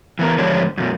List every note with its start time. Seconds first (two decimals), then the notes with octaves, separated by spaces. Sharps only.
0.19 E3 B3 A#4
0.38 G#2 D3 F3 D4 G4 C#5
0.78 F#2 B2